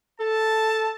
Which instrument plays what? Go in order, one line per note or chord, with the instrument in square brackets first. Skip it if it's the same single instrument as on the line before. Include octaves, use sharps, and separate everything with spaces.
[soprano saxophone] A4 [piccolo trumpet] A5